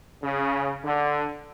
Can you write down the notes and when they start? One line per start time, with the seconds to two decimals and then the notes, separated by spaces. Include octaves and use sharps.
0.23 C#3
0.84 D3